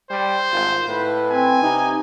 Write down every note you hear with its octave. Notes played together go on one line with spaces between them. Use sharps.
G3 C5
G#1 F4
A2 B4
C4 G#5
C3 D#4 G4